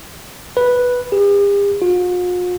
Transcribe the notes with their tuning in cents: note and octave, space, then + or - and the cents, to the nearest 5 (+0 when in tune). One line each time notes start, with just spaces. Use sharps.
B4 -5
G4 +45
F4 +45